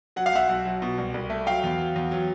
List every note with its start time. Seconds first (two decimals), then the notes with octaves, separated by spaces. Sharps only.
0.16 F#3 F#5
0.26 F5
0.33 B1 E5 F#5
0.49 B1
0.65 F#3
0.82 B2
0.98 C2
1.14 C2
1.30 A3
1.46 F#3 F5 G5
1.64 E2
1.79 F#3
1.96 E2
2.11 F#3